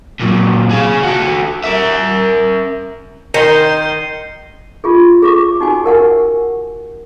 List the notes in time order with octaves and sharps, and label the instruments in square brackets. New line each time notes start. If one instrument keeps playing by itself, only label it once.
[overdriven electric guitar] A#2 F#3
G#4 F5
F#4 A4
A#4 E5
[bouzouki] D#3 [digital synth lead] A#4 [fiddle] C6 [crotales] G6 C#7 D#7
[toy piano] F4 G4 G#4
G#4 C#6 D6
D#4 F#4 G#5
G4 A#4 F#5 G#5